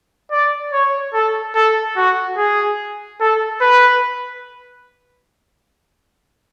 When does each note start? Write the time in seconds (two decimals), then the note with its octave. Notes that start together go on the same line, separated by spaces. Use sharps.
0.31 D5
0.73 C#5
1.14 A4
1.55 A4
1.97 F#4
2.37 G#4
3.20 A4
3.61 B4